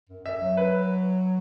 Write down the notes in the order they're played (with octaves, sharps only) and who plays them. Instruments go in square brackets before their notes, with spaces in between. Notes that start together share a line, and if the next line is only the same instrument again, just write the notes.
[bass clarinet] F#2
[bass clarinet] F#2 [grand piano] E5
[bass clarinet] F#3
[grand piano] B4